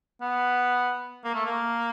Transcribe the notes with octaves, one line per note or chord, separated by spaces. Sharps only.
B3
A#3
A3
A#3